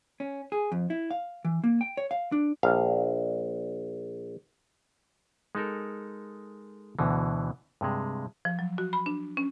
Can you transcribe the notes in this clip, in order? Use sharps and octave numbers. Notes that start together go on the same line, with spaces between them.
C#4
G#4
F2
E4
F5
E3
A#3
G5
C#5
F5
D4
A#1 F5
G#3 D#4 A4 A#4
D2 B2 D3 E3
G2 C3 G#3
F3
F#3
F#4
B5
D4
C#4